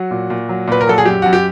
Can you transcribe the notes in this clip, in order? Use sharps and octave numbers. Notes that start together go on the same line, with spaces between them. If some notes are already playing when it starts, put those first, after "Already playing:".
Already playing: F#3 F#4
A#2
A#2
F#3
A#2 B4
A#4
F#3 A4
G#4
F#2 G4
F#2 F#4
G4